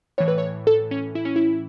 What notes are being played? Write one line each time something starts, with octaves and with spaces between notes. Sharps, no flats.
A2 E3 C#5
B4
C#5
A4
C#4
E4
C#4
E4